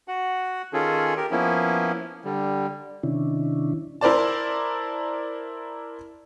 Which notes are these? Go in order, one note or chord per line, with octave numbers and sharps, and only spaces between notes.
F#4 F#5
D#3 C#4 F4 G#4 A4
G4 A#4
F3 A#3 B3 C#4 E4
D3 G3
C3 D#3 C#4 D4 E4
E4 A#4 C5 D5 A5